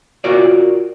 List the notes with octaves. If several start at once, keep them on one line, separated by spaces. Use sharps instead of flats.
F4 F#4 A#4 C#5 D5